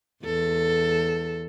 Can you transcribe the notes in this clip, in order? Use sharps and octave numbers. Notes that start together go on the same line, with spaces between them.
E2 A4